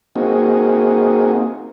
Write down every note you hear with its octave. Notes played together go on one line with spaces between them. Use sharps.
A#3 C4 D#4 F#4 G#4